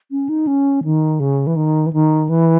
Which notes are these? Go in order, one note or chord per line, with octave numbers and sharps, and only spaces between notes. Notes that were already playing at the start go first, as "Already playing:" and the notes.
C#4
D#4
C#4
D#3
C#3
E3
D#3
E3
D#3
E3